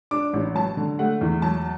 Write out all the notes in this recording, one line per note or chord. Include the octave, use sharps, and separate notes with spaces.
D4 D6
A1
F#3 A5
D3
A3 F#5
E2
F#3 A5